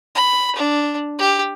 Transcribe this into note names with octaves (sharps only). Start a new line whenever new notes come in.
B5
D4
G4